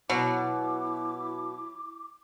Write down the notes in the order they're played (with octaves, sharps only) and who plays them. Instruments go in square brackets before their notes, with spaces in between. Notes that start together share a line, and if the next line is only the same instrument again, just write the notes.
[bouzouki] B2 [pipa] F#3 [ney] E4 [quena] D6